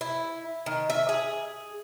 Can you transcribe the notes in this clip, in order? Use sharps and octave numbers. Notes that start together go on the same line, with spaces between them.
E4
D#3
E5
G#4